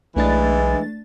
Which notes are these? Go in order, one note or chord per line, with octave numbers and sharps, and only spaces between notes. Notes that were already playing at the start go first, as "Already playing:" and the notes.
B1 E3 G#3 A3 D4 A6